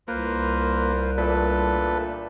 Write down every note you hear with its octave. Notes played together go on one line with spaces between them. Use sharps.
C2 A#3 F4 B4 C5
A#2 A3 D4 A4 B4